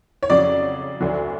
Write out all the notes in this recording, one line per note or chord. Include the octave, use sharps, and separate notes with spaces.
C#5
F2 C#3 F#3 D5
D2 D3 F#3